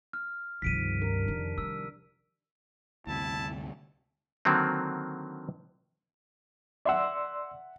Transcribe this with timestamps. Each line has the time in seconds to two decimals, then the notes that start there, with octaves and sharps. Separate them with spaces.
0.13 F6
0.62 C#2 G2 C3 D#3 F3 B6 D7 D#7
1.01 D4 A#4
1.28 F2 D4
1.58 G3 E6
3.07 D2 G2 C3 E4 A5
4.45 D3 D#3 F#3 A#3 C4
6.85 D5 E5 F#5 C6 E6